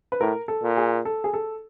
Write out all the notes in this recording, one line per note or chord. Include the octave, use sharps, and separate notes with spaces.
B4
A2 A#4
A4
A#2
G#4
A4
G#4
A4